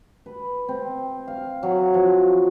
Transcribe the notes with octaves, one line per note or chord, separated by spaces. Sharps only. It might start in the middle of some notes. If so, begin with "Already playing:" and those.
B4
C4
F5
F#3
F3